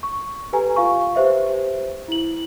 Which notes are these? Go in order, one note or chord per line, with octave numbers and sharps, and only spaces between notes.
C#6
G4 A4 B4 G#5 A#5
F4 F5 C#6
G4 B4 C5 E5
E4 F#7